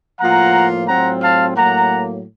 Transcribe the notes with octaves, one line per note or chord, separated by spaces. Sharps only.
A2 F3 A#3 F4 F#5 A#5
A2 F#3 C4 F4 F#5 A#5
F5 A5
A2 F#3 A#3 F#5 A#5